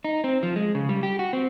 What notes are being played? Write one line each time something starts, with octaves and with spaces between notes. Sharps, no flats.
D#4
C4
F3
G#3
C#3
G3
G4
F#4
C4